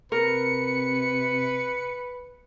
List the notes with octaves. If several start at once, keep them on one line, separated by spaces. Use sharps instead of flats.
C3 A#4 B4 C#7